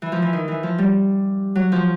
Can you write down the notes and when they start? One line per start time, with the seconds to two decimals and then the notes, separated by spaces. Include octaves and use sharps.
0.02 E3
0.12 F3
0.22 E3
0.33 D#3
0.48 E3
0.63 F3
0.78 G3
1.55 F#3
1.72 F3